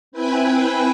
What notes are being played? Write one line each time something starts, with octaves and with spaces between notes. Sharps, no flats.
C4 E4 B4 G5 G#5 B5